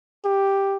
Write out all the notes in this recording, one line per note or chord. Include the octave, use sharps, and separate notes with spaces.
G4